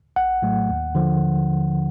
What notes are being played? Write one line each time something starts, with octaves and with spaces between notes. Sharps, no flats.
A#1 F#5
A2 F#3 A3
D#2
D3 F3